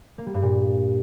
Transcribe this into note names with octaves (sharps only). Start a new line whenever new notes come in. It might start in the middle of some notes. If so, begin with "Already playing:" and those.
A#3
G3
G2
A#2